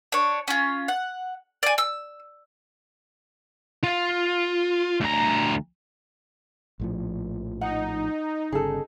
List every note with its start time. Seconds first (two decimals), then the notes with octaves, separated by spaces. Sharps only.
0.12 D4 C#5
0.48 C#4 F4
0.88 F#5
1.63 D5 G#5
1.78 E6
3.83 F4
5.00 D2 A#5
6.80 A#1 A2 F3
7.61 D#4 F#5
8.52 G1 C#3 G#4 A4